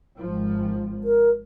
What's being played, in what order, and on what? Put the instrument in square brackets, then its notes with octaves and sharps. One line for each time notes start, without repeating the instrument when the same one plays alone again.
[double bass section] G#1 F3
[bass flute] A#4